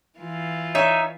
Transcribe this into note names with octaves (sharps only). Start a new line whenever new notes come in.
E3 F4
D#4 C#5 E5